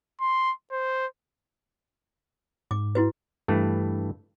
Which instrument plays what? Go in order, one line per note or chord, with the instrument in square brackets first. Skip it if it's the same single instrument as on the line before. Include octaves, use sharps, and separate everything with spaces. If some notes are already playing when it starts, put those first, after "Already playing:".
[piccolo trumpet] C6
C5
[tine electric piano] G#2 [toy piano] D6
[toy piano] E4 F#4 B4
[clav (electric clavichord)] G2 E3 A3